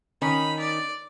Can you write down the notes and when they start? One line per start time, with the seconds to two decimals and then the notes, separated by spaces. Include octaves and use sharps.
0.22 D#3 C#4 D#4 B5
0.59 D5